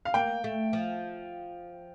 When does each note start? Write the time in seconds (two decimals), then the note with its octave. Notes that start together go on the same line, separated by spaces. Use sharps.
0.05 F5
0.14 A#3 G5
0.44 A3
0.73 F3